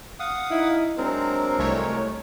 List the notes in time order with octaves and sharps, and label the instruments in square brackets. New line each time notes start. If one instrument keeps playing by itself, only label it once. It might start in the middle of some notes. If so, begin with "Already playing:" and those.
[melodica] F5 F#5 D#6
[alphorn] D#4 [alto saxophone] E4
[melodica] F#3 G#3 A#4 [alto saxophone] C4 [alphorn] D4
[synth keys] C2 A3 C#5